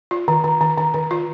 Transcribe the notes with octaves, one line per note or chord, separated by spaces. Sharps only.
F4
D#3
D#3
D#3
D#3
D#3
F4